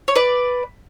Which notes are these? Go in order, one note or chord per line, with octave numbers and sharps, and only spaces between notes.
C#5
B4 D5